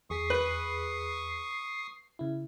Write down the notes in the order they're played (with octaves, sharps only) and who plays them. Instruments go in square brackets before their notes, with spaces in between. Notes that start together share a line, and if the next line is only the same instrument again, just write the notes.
[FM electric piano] E2 G#4 B6 [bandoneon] C#6 D#6 [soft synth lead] C7
[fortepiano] B4
[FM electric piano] C#3 E4